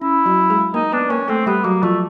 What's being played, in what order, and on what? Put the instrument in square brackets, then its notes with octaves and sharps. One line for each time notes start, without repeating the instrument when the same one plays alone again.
[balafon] C#4 [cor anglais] E4
[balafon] F#3 F#4
G#3 G#4
[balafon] A#3 A#4 [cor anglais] D#4
[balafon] B3 B4 [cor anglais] D4
[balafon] A#3 A#4 [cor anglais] C#4
[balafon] A3 A4 [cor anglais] C4
[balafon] G3 G4 [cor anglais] B3
[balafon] F#3 F#4 [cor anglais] A#3
[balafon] F3 F4 [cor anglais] A3